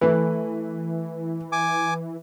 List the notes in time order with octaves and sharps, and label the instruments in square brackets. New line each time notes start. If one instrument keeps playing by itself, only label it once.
[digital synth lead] E3 [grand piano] A3 B4
[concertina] G#5 D6